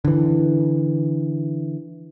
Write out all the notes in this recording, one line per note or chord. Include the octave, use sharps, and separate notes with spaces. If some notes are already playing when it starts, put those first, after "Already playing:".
D3 E3